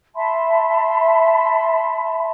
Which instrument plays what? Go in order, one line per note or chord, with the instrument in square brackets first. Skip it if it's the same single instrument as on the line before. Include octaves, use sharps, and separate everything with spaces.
[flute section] E5 A5 B5 C6